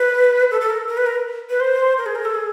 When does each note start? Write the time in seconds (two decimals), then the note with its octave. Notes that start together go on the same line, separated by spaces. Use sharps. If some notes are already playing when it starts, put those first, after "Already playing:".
Already playing: B4
0.51 A4
0.61 A4
0.70 A#4
0.88 A#4
0.97 B4
1.06 A#4
1.50 B4
1.60 C5
1.98 A#4
2.06 G#4
2.15 A#4
2.25 A4
2.34 G#4